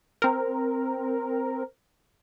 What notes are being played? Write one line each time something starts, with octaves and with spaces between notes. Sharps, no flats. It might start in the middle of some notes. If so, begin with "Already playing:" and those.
C4 A#4